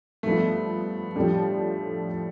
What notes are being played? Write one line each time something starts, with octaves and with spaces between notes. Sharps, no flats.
G2 F3 A3 B3
A2 F3 G3 A3 D4